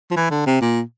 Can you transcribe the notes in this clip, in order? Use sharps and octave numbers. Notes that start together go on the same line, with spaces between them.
F3
E3
D3
C3
A#2